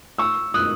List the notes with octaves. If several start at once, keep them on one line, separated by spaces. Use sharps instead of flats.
C#6 E6
D#6 F#6